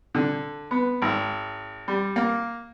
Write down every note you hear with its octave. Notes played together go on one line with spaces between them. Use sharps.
D3
B3
G#1
G3
A#3